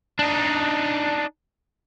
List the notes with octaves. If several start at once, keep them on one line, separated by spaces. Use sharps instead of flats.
D4 D#4